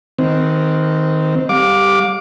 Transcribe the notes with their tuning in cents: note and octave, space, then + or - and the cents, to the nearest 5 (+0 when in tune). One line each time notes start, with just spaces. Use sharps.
D#3 +15 C4 -15
G3 +0 F5 +35 D6 +0